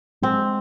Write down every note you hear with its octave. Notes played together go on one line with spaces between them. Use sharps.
G#3 C4